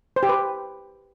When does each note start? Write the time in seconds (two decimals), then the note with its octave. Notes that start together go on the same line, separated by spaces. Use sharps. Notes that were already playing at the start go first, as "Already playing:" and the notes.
0.16 C5
0.23 G4
0.29 B4